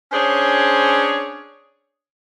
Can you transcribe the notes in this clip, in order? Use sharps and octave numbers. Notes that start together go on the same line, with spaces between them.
C#4 D4 G#4 C5 C#5